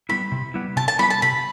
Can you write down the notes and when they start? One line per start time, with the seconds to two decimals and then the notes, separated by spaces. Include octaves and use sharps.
0.09 G3 B3 E4 B5
0.32 C3
0.54 G3 B3 E4
0.76 C3 A5
0.88 A5
0.99 G3 B3 E4 B5
1.10 A5
1.22 C3 B5